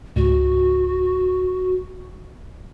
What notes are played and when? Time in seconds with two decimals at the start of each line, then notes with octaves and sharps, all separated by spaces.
0.16 C#2 G#2 F#4